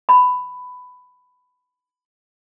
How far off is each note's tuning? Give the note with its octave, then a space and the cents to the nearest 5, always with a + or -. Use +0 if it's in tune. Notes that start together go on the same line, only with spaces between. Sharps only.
B5 +15